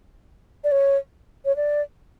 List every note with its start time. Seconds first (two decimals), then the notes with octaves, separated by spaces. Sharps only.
0.64 D5
0.72 C#5
1.45 C#5
1.56 D5